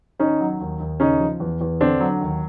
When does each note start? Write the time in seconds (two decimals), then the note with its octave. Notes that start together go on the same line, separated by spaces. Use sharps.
0.19 D#3 C#4 D#4
0.40 F#3
0.60 D#2
0.80 D#2
1.00 C#3 C#4 D#4
1.20 F3
1.40 E2
1.61 E2
1.81 D3 C4 D4
2.00 F#3
2.21 D#2